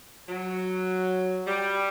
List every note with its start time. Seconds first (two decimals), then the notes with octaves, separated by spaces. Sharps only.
0.28 F#3
1.46 G3